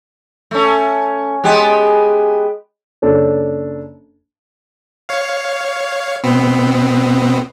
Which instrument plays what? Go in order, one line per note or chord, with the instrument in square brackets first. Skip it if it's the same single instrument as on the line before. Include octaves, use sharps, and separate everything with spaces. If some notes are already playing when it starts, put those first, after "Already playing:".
[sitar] A3 C#4
G#3 B3 G4
[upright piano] F#1 D4 A4 C#5
[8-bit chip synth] C#5 F5
B2 B3 C4